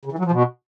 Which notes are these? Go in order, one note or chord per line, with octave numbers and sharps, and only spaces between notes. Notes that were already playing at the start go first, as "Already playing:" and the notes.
C#3
E3
F#3
F3
B2